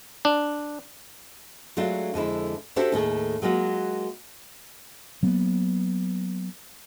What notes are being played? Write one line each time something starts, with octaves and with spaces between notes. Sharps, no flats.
D4
F#3 G#3 A3 D4 F4
F2 D3 G#3 E4
D4 F#4 G4 A4 C5 E5
D#2 A2 A3 G#4
F#3 G#3 A#3 F4 F#4
F#3 A#3 B3